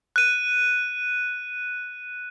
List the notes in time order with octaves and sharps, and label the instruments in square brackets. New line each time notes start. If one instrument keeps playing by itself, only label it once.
[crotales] F#6 D#7